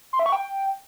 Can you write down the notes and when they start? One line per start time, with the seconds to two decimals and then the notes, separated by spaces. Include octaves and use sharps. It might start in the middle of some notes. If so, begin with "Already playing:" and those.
0.13 C6
0.19 E5
0.26 C#6
0.32 G5